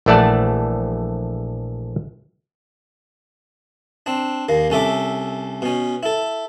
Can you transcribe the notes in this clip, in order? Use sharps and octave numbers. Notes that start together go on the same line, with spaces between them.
A#1 E3 A3 D5 F#5 A5
C4 D4
D#2 A#3
C2 C#4 A4 E5 D6
B2 C#4
E4 A4